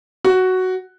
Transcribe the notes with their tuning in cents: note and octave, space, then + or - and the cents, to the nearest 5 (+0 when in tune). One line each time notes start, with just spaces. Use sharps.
F#4 +5